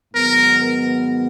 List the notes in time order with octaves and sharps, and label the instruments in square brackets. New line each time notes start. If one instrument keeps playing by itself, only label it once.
[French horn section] G#2 D#3 F#3 B3 [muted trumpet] A#4